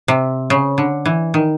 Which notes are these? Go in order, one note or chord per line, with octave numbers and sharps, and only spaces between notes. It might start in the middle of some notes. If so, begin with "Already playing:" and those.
C3
C#3
D3
E3
D#3